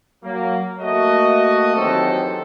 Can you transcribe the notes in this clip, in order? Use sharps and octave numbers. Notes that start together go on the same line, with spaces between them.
F#3 A#3
A3 A#3 F#4 D#5
E2 D#3 F#3 C4 G4 A4